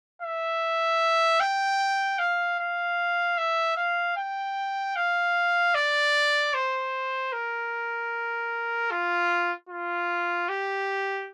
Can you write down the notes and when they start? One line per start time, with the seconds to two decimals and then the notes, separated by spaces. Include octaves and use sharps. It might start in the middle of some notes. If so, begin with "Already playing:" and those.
0.22 E5
1.40 G5
2.19 F5
2.59 F5
3.38 E5
3.77 F5
4.17 G5
4.96 F5
5.75 D5
6.54 C5
7.33 A#4
8.91 F4
9.69 F4
10.49 G4